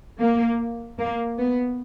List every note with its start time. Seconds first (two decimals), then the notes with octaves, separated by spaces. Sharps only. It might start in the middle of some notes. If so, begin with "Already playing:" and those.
0.19 A#3
0.98 A#3
1.38 B3